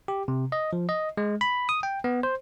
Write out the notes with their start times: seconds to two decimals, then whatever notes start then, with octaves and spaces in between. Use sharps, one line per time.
0.08 G4
0.28 C3
0.52 D#5
0.73 F3
0.89 D#5
1.17 G#3
1.41 B5
1.69 D#6
1.83 G5
2.04 B3
2.23 C5